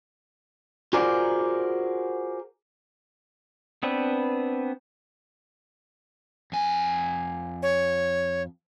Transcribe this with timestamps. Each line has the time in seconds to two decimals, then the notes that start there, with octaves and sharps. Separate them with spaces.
0.93 F4 F#4 G#4 A#4 C5 D5
3.83 B3 C4 D4 B4
6.52 F2 G#5
7.63 C#5